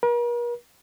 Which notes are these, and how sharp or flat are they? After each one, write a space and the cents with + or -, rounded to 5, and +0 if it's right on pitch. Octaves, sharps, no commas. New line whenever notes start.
A#4 +45